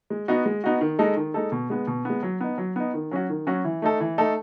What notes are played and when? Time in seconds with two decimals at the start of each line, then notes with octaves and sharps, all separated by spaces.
0.10 G#3
0.28 B3 D#4 F#4
0.46 G#3
0.64 B3 D#4 F#4
0.81 D#3
0.99 G#3 D#4 A4
1.16 D#3
1.34 G#3 D#4 A4
1.52 B2
1.70 G#3 B3
1.87 B2
2.05 G#3 B3
2.23 F#3
2.40 B3 D#4
2.58 F#3
2.76 B3 D#4
2.94 D#3
3.11 F#3 C#4 F#4
3.29 D#3
3.47 F#3 C#4 F#4
3.65 E3
3.82 A3 D#4 A4
4.00 E3
4.18 A3 D#4 A4